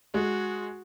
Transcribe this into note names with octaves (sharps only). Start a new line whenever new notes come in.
G#3 F#4